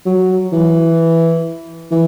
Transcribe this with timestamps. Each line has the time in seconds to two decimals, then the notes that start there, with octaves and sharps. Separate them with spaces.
0.06 F#3
0.52 E3
1.91 E3